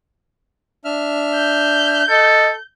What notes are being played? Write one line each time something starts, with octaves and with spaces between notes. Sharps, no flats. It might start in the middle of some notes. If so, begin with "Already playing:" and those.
D4 E5 F6
G6
A4 D#5